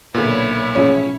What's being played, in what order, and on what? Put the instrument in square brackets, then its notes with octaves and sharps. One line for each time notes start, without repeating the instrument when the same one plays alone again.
[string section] B1 E4 C#5 [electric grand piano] A#2 [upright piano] D3 B3
[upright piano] A1 F3 G#4 [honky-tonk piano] C#4